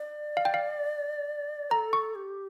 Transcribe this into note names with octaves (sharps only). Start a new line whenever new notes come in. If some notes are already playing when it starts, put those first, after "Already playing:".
Already playing: D5
F5
G5
F5
A4 A#5
C#6
G4